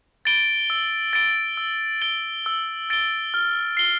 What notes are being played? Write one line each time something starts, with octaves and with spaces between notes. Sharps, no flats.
A6 D7 G7
E6
A6 D7 G7
E6
A6 D7 G7
E6
A6 D7 G7
F6
C7 G7